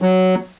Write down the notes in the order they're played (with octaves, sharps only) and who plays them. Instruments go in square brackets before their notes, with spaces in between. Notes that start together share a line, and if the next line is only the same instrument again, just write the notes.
[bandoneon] F#3